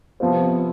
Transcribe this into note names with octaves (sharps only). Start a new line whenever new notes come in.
C3 F3 B3 F4 C5